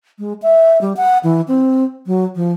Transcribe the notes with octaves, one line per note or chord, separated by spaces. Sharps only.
G#3
E5
G3
F#5
E3
C4
F#3
F3